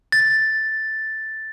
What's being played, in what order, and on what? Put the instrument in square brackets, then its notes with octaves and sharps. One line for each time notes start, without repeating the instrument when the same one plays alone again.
[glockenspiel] A6